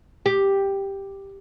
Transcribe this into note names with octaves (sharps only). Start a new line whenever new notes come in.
G4